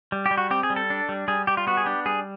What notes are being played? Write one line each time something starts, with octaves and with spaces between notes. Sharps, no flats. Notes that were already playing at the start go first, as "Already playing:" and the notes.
G3
G4
G3
F#4
C4 G4
G#4
G3
A4
D4
G3
G3 G#4
G3 G4
F4
B3 F#4
G#4
D4 G4
G3 G#4